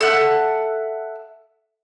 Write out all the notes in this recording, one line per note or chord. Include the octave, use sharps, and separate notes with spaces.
A4 E5 F#5 F#6